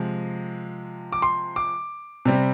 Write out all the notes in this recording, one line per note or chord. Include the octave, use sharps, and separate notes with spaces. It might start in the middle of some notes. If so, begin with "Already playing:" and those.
Already playing: C3 F3 G#3
D6
C6
D6
C3 G3 C4